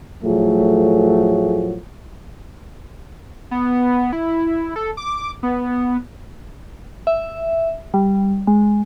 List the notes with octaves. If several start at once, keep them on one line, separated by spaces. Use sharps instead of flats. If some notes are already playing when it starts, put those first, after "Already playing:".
A2 F3 F#3 A3 G#4
B3
E4
A4
D6
B3
E5
G3
G#3